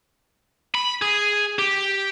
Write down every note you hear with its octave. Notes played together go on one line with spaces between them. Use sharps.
B5
G#4
G4